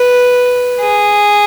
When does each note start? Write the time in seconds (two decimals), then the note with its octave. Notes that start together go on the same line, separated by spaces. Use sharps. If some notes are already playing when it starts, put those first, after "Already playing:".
Already playing: B4
0.81 G#4